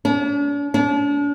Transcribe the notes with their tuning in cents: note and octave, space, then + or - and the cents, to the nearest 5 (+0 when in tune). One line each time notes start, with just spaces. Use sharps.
D4 -45
D4 -40